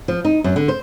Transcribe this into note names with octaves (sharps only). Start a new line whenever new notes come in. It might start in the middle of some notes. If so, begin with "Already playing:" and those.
F3
D#4
F#2
D3
C5